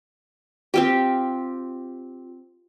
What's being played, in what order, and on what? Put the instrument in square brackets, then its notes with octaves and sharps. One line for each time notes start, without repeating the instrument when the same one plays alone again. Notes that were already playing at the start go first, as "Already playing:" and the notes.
[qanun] C4 F4 G4